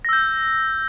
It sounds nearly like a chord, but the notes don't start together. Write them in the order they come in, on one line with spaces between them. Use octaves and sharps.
A#6 E6 G6